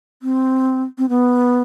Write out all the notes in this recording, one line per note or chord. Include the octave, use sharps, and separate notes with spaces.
C4
C4
B3